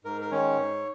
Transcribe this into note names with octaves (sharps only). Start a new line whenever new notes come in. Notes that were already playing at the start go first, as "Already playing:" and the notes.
G#2 A#4
A#4
D#3 G#3 C#4 C#5
G#2